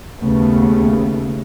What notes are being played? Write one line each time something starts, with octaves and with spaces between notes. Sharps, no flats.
D#2 C#3 A3 B3